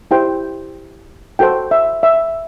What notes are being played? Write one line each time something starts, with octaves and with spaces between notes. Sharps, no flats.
E4 G4 C5 G5
F#4 A4 C5 G5
E5
E5